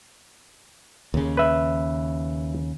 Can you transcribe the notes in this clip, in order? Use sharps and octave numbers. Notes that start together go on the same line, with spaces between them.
D#2 C#3
B4 E5